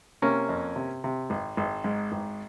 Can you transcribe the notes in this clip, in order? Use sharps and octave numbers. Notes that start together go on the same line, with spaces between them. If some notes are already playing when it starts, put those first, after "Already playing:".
C3 A#3 C#4
F2
C3
C3
G#1
G#1
G#2
G#1